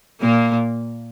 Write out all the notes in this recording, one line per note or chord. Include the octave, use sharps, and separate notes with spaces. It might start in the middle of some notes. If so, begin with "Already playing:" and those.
A#2 A#3